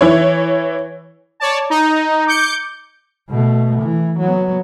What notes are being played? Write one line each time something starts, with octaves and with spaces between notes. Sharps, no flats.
E3 E4 C#5
C#5 D5 A5
D#4
D6 G6 C#7
B2 A3
E3
F#3 B3